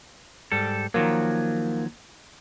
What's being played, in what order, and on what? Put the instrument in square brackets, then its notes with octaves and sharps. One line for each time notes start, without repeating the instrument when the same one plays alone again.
[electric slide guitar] G#2 G3 A4
[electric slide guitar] D#3 F3 F#3 [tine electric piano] A#3